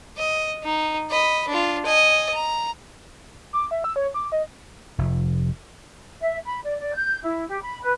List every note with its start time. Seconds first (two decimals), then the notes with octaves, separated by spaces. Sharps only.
0.17 D#5
0.64 D#4
1.11 D#5 B5
1.48 D4 F4
1.86 D#5 G#5
2.34 A#5
3.53 D6
3.71 E5
3.84 E6
3.96 C#5
4.14 D6
4.32 D#5
4.98 F1
6.20 E5
6.44 B5
6.64 D5
6.78 D5
6.93 G6
7.23 E4
7.48 G4
7.61 B5
7.82 B4